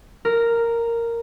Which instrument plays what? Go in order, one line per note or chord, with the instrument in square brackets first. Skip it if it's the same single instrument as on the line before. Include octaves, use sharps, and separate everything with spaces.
[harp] A#4